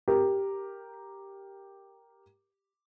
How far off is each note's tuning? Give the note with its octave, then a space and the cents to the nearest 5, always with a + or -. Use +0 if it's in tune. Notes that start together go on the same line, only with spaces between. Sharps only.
G4 +0 A#4 +0